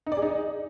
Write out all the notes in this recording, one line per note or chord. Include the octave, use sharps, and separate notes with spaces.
D#4
D5
G#4
D#4